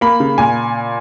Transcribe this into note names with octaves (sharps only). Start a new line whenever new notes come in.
A#3 B5
C#3
A#2 G#5